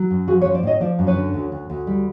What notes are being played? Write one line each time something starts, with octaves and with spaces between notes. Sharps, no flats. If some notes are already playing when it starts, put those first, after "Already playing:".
Already playing: F#3
F#2
F3 F#4 G#4
B4 C#5
F3
C5 D5
A2 C#5 D#5
F3 C5 D5
F#2
B4 C#5
D3
D2
D2
D2
G3